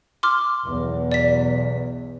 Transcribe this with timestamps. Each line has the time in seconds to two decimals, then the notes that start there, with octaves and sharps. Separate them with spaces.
0.23 C6 D6 F6
0.64 B1 E2
1.12 D5 B6